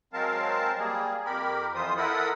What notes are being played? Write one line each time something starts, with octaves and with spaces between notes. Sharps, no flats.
F#3 G#3 C4 A#4 F5 A5
G3 A#3 G#4
F2 G4 A#4 B5
F2 E3 F4 C5 D#6
E4 A4 A#4 F#5 B5 D#6